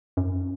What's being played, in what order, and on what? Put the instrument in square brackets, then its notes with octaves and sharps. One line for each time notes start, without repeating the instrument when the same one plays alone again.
[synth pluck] F#2